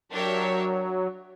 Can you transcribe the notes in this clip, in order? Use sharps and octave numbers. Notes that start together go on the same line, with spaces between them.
F#3 D4 G4 A#4 C#5 E5